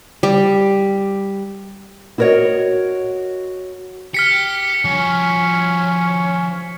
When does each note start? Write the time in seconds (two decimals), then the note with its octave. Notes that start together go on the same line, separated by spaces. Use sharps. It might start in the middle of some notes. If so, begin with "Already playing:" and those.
0.23 G3
2.18 E4 F#4 A#4 B4 C#5 D#5
4.14 G4 F6 B6 C#7
4.85 F3 C#4 F#4